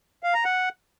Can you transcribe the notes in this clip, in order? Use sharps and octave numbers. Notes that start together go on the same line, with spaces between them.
F5
A#5
F#5